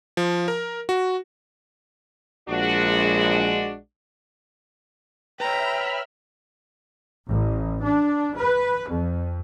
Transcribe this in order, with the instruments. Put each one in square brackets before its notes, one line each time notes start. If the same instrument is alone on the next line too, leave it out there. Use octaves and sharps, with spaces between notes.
[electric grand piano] F3
A#4
F#4
[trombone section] A#1 G#3 [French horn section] D4 F#4
[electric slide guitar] B4 C#5 [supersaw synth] E5 B5 F6 [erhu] G5 [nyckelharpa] A#5
[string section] A1
D4
B4
F2